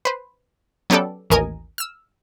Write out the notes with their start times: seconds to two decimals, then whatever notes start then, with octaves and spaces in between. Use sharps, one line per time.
0.05 B4 C5
0.90 F#3 B3 C#4 G4 A4 D5
1.30 A1 D#2 A#4 D#5 G#5
1.78 E6 F6